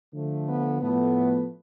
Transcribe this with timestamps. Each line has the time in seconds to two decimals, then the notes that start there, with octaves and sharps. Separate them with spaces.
0.13 D3 F3 A3
0.47 B3
0.81 A2 F3 A3 B3